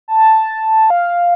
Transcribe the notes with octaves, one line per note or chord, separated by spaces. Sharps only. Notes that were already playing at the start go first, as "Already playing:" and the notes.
A5
F5